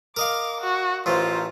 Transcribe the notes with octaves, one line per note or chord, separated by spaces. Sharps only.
A#4 D#5 F5 D6
F#4
A1 A3 F4 A#4 C5